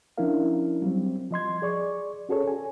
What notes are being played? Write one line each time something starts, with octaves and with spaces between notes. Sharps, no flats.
F3 C#4 D4 E4 A#4 F5
F#3 G3 C4
F3 D#5 C6 G#6
G#4 D5 C#6
C#4 F#4 G#4 A4 C#5
G#5